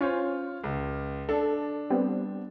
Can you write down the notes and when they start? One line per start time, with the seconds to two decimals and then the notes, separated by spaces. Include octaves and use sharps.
0.01 C#4 F4 C5 C#5
0.64 C#2
1.29 D4 A4
1.90 G3 B3 C4